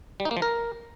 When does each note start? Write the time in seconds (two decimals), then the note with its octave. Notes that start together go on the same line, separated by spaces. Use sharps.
0.20 G3
0.25 D#4
0.31 A#3
0.37 F3
0.42 A#4